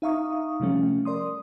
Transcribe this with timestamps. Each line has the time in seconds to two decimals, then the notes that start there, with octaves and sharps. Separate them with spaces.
0.02 D#4 E5 F5 A#5 C#6 D#6
0.60 C3 F3 G3 A3 C#4
1.05 A#4 D5 C6 D#6